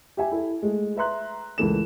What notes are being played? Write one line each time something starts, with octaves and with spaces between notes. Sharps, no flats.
G4 E5 G#5
E4 A4
G#3 A3
B4 E5 A#5 C6 F#6
C#2 A2 E3 A4 A#4 E7